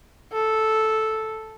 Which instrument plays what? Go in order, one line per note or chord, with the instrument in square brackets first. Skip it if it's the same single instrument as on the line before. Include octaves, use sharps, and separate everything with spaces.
[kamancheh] A4